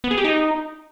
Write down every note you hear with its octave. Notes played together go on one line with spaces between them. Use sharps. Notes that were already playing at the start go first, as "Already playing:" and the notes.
B3
G#4
G4
D#4